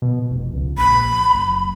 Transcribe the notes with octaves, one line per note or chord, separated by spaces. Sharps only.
B2
F1
C#2
A#1 B5
F#1